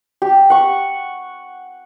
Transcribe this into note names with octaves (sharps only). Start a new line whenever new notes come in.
G4
F#5 C#6